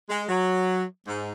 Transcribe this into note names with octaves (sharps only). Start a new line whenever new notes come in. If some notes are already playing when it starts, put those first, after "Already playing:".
G#3
F#3
G#2